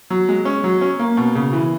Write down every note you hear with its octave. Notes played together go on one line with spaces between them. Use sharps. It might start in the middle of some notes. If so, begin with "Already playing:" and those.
F#3
G#3
C#4
F#3
C#4
A#3
B2
C#3
E3